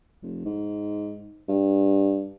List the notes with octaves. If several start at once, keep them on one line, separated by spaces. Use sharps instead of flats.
F1
G#2
G2